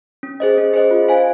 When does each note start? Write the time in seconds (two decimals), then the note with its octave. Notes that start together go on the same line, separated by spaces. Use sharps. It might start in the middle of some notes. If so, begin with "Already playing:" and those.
0.23 C#4
0.40 G#4 C5 D#5
0.58 C#4
0.73 G#4 C5 D#5
0.91 F4
1.08 C5 F5 G#5